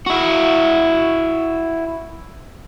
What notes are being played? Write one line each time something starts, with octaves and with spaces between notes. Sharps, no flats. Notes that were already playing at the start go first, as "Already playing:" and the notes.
E4 F#4